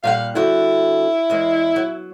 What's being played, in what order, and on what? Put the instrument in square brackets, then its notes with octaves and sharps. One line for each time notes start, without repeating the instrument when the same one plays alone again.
[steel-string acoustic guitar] A#2 G3 F#5 [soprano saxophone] F5
[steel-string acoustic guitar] D3 G3 F#4 [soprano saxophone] E4
[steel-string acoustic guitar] E2 G#3
F#3